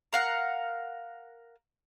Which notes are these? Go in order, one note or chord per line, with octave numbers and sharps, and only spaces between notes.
A#4 F5 F#5